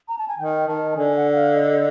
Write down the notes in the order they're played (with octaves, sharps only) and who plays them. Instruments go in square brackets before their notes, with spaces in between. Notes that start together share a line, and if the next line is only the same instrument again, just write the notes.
[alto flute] A#5
A5
G#5
[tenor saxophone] D#3 [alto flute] G5
[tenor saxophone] D#3 [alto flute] A5
[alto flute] A5
[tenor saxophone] D3 [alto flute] G#5
[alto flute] F#5
F5
D#5